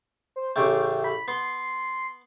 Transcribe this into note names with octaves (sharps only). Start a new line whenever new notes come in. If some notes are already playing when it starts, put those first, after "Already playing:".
C5
A1 C#3 A3 G5
B5
B3 C6